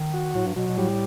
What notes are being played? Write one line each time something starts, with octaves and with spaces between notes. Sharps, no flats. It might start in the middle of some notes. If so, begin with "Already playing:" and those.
Already playing: D#3
F#4
A2 F#3
G2
B2 F#3
B2
A2 G3